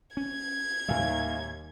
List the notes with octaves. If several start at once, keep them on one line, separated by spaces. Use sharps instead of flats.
C#4 G#6
D#2 A2 G3 E5 F5 G#5